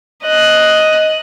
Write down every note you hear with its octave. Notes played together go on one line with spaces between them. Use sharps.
D#5 F#6